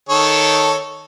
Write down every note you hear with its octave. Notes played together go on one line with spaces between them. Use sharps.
D#3 A4 C#5